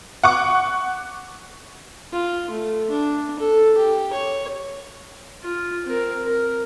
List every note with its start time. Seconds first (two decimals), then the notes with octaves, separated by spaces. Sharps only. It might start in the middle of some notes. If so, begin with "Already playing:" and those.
0.23 F#5 C#6 D6
2.12 F4
2.50 A3
2.90 D4
3.39 A4
3.77 G4
4.13 C#5
5.43 F4
5.86 C4 A#4
6.24 A#4